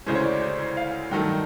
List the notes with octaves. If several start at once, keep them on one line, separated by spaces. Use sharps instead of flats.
D2 C#3 E3 G#3 C#4 C5
C#5
D5
C5
C5
F5
G2 D#3 F#3 A3 G5